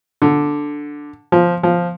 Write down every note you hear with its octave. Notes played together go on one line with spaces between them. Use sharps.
D3
F3
F3